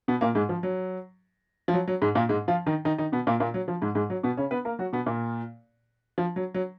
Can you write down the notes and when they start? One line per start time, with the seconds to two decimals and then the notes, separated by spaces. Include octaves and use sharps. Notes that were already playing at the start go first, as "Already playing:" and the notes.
0.08 B2 B3
0.21 A#2 A#3
0.35 G#2 G#3
0.49 F3
0.63 F#3
1.68 F3
1.73 F#3
1.88 F#3
2.02 G#2 G#3
2.15 A#2 A#3
2.29 G#2 G#3
2.48 F3 F4
2.66 D#3 D#4
2.85 D#3 D#4
2.98 D#3 D#4
3.12 B2 B3
3.27 A#2 A#3
3.40 A#2 A#3
3.54 F#3
3.68 F3
3.82 G#2 G#3
3.95 G#2 G#3
4.10 F#3
4.23 B2 B3
4.37 C#3 C#4
4.51 B3 B4
4.65 A#3 A#4
4.79 F#3 F#4
4.93 B2 B3
5.06 A#2 A#3
6.18 F3
6.36 F#3
6.55 F#3